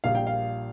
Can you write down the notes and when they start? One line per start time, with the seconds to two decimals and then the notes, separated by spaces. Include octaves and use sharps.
0.04 A#1 A#2 G3 A#3 F5
0.15 G5
0.27 F5